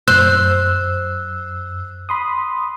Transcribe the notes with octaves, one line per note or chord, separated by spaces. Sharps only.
F#2 C5 E6 F#6
B5 C6 D#6